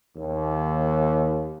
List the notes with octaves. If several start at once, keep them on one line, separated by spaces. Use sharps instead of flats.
D#2